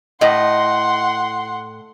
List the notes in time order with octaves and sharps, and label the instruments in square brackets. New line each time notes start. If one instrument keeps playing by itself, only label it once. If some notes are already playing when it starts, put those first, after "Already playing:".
[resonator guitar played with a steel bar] A2 [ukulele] D#5 [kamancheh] F#5 C6